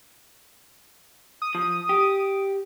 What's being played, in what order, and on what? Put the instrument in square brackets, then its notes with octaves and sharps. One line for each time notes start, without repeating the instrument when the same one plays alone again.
[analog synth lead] D#6
[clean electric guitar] F3
G4